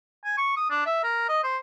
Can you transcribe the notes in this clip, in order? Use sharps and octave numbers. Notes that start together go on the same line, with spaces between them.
G#5
C#6
D#6
D4
E5
A#4
D#5
C5